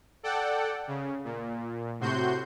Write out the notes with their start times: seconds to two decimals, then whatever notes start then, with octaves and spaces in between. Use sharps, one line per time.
0.23 A4 D5 F#5 G5
0.87 C#3
1.24 A#2
2.00 A2 C3 F#4 C6 G6